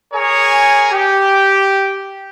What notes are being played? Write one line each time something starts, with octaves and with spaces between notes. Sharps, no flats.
G#4 A#4 C#5 G#5
G4